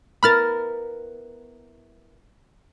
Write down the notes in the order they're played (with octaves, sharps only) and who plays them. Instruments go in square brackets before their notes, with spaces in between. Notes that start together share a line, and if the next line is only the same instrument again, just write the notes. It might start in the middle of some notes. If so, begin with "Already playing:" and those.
[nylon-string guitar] B3 E4 A#4 [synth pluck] B5 F6 A6